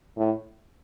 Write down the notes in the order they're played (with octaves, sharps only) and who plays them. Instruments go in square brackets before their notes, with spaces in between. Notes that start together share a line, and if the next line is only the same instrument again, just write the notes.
[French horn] A2